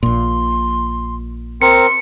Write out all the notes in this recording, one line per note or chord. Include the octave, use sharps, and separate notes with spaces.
A#1 A#2 C6
C4 A#4 C6 C#7